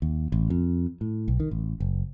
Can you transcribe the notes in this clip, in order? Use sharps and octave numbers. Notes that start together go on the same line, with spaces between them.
D#2
A1
F2
A2
B1
D#3
A1
F#1